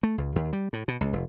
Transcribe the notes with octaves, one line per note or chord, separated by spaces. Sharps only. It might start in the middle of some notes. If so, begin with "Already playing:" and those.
A3
C#2
D#2
G3
A2
B2
C#2
F1